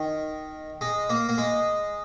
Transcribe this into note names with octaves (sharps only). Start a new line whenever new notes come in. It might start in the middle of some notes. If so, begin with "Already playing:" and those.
Already playing: D#3
G#3
A#3
A#3
G#3